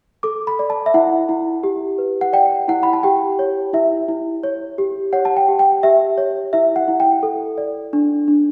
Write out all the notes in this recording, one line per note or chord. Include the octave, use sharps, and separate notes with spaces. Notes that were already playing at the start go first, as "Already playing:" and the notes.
A4 D6
B5
D5
A5
E5
E4 F#5
E4
G4
B4
F#5
D5 G5
E4 F#5
B5
A5
G4 G5
C#5
E4 E5
E4
C#5
G4
C#5 F#5
A5
G5
G4
G5
G4 E5
C#5
E4 E5
F#5
E4
G5
A4
D5
D4
D4